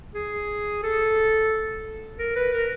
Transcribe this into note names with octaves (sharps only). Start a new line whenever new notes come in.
G#4
A4
A#4
B4
A#4